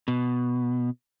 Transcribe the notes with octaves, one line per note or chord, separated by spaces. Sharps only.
B2